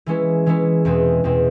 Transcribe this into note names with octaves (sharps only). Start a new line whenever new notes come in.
E3 G#3 C#4 E4
E3 G#3 C#4 E4
E2 B2 G#3 C4
E2 B2 G#3 C4